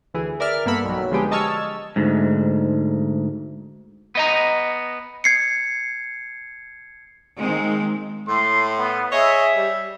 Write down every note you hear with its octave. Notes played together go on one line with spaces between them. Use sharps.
D2 E3 G#4
A#4 D5 E5 F6
G2 A#3 B3 A4 B5 E6
B1 F#3
D3 F3 G#3 B3 G4 G#4
D#5 A5 C#6 E6 F6 G#6
D2 G#2
B3 D#5 A#5
G#6 C7 C#7
D#3 G#3 A#3 C4
A2 C6
B3
G#4 C#5 D#5 E5
G3